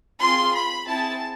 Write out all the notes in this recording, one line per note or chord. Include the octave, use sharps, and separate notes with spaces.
C4 F4 G#4 C6
B5
C4 E4 G#4 A5